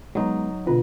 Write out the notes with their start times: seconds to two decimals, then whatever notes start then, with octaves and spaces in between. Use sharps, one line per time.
0.15 F#3 G#3 B3 D#4
0.67 B2 D3 F4 B4